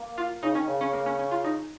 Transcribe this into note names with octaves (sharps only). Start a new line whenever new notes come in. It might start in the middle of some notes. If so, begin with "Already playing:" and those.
Already playing: A#3
F4
C#3 D#4
D#3 C#4
C#3
C#4
A#3
C#4
C#4
F4
D#4